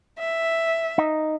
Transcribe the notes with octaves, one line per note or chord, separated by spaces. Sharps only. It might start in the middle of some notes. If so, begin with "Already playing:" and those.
E5
D#4